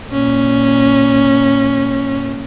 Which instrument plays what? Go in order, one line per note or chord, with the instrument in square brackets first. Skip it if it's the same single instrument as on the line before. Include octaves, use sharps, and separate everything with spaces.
[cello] A#2 C#4